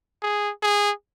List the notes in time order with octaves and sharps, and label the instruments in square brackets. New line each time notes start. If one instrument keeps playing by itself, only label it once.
[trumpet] G#4
G#4